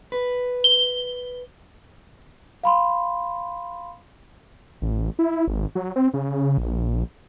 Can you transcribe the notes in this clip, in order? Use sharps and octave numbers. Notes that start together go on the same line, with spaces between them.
B4
G7
F5 B5 C6
A1
E4
G#1
F#3
C4
C#3
A#1